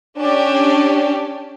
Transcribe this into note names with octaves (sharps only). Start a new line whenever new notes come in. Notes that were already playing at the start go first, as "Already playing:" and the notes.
C#4 D4 G4